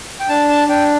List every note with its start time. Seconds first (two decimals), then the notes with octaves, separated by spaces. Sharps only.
0.20 G5
0.29 D4 A5
0.49 A5
0.68 D4 G5